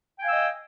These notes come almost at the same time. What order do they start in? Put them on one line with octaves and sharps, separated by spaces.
G5 G#5 F5 E6 D#5